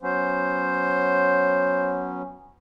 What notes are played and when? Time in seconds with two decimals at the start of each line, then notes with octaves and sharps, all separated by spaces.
0.03 F#3 B3 C#4 C5